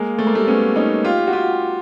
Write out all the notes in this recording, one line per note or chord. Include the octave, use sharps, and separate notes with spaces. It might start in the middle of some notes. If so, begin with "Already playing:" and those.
Already playing: G#3 A#3
A3
A#3
G3 A3
B3 C#4
C#4 D#4
F4 G4
F#4
F4 G4